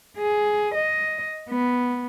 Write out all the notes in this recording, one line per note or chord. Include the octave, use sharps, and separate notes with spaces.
G#4
D#5
B3